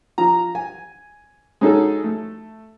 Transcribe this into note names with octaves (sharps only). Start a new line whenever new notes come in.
F3 A#5
G#5
G#3 C#4 D#4 F#4 G#4 A4
A3